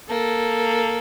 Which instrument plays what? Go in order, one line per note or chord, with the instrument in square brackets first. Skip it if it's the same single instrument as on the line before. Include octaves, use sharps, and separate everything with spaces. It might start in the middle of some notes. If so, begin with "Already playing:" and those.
[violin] A#3 [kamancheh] A4